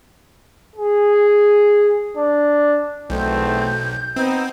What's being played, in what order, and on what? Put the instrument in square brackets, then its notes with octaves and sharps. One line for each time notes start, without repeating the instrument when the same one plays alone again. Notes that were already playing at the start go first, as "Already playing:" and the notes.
[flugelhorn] G#4
D4
[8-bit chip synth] B1 [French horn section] E2 A3 B3 [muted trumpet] C4 [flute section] G6
[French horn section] B3 [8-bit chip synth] C4 [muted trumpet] D#4